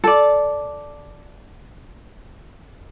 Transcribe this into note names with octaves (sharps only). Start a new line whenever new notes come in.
A4 D5